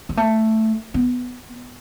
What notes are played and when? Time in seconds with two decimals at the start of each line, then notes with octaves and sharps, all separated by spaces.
0.09 G#3
0.17 A3
0.94 B3